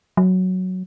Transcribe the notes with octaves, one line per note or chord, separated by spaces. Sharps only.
F#3